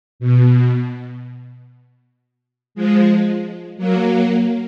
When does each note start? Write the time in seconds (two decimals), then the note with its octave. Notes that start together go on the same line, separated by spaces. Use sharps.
0.20 B2
2.75 F3 G#3
3.77 F#3 A#3